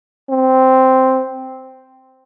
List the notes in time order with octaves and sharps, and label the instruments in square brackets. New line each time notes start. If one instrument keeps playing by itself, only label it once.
[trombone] C4